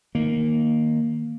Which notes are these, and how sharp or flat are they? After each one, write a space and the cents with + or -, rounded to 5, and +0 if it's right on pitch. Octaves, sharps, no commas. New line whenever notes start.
D#3 +0 A#3 +0